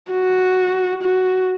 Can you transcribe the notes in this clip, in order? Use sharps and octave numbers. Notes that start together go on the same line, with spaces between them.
F#4
F#4